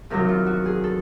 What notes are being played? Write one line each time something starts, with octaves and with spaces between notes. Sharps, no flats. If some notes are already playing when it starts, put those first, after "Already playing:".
E2 C3 D#3 F#3 A#4
F4
F#4
G#4
A4